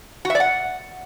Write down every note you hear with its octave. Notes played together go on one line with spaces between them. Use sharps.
F#4
E5
D5
F#5